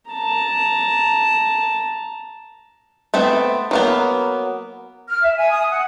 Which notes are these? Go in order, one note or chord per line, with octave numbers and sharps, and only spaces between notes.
A5 A#5
A3 B3 C4
F#3 A#3 B3
F6
E5
G#5
D#6
F#5